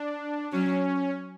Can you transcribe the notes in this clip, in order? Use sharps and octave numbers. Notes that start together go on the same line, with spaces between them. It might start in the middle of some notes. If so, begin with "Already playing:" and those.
Already playing: D4
F#3 C#4